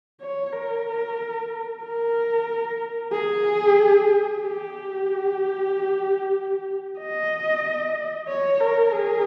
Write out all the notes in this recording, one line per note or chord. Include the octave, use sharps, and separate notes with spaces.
C#5
A#4
A#4
G#4
G4
D#5
C#5
A#4
G#4